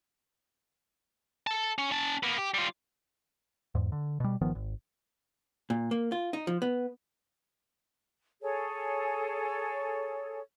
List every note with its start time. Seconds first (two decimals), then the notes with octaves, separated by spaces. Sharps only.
1.47 A4 A5
1.78 C#4
1.91 C#4 A5
2.23 A#3 B3
2.38 G4
2.54 G3 F4
3.75 E2 G#2
3.92 D3
4.20 B2 G3
4.41 G1 D#3 F3 B3
4.55 G#1
5.70 A#2
5.91 A#3
6.12 F4
6.33 D#4
6.47 F3
6.62 B3
8.42 G#4 A4 C#5